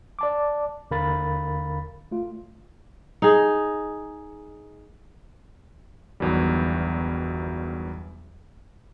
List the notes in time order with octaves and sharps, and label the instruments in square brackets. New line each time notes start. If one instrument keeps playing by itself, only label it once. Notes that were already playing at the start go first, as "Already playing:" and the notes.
[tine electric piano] D5 A5 D6
D#2 D3 A#4 F5 B5 A6
A3 F4
[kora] D#4 G#4
[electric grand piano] G1 E2 D#3 F#3 G3